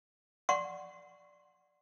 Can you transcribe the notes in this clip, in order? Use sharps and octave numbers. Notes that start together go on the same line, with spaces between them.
D5 F#5 C6 C#6